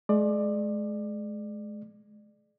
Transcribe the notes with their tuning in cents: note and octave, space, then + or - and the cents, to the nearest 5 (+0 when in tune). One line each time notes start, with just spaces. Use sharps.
G#3 +35 D5 +25